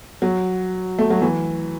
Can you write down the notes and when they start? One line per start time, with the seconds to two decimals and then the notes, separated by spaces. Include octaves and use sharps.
0.22 F#3
0.99 A3
1.10 F#3
1.22 E3